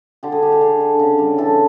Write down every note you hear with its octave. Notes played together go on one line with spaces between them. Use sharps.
D3 G4
G#4
D3 G4
G4
D3 G#4
D3
C#3
G3
E3 A4